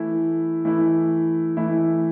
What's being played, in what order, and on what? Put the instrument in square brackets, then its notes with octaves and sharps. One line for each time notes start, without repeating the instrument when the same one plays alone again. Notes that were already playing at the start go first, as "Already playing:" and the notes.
Already playing: [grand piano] E3 A3 E4
E3 A3 E4
E3 A3 E4